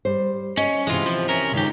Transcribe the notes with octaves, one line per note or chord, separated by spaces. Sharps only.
G3 C5
C#4 D#5
C3 E3 G#3 F4
F3
C#4 A#4
C#2 D#3 C#4 G4